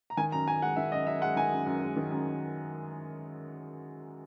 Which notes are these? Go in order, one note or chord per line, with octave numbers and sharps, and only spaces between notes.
A#5
D#3 G#5
F#2 A#5
F#2 G#5
G#3 F#5
D#3 E5
F#2 D#5
F#2 E5
G#3 F#5
D#3 G#5
F#2
F#2
G#3
D#3
F#2